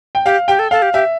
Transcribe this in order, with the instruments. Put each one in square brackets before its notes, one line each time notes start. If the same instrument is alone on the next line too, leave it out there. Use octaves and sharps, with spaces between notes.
[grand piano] G5
[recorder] G4 [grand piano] F5
[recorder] G4 [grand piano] G5
[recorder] A4
[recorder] A4 [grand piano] F5
[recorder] G4
[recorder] G4 [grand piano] E5